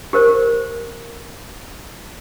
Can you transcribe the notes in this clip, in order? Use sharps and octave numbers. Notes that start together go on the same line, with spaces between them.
G4 A#4 C5